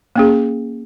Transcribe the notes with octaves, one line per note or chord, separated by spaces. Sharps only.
A#3 C#4 G#4